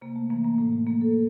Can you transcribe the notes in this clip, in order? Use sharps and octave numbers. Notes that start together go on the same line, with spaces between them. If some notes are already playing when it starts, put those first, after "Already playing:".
C3 A#3
A3
E3 A#3
A#3
A2 A#3
A3
F3 A#3
A4